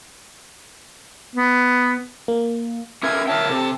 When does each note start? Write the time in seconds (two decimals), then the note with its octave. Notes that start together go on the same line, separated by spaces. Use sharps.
1.35 B3
2.28 A#3
3.03 C#4 A#4 B4 E5 G#6
3.27 A#4 C#5 E5 G5 A5
3.50 C3 A4